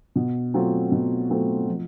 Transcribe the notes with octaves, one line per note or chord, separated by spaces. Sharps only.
B2
F#3 A3 C4 F4
B2
F#3 A3 C4 F4
F3